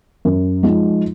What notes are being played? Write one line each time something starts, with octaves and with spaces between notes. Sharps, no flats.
F#2
F3 G#3 D#4